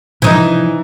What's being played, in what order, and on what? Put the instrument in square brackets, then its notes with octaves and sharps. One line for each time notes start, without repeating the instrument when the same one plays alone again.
[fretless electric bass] C3 F3 D4 [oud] E3 D#4